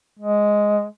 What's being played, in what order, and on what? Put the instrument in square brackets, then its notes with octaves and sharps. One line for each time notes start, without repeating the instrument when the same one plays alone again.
[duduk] G#3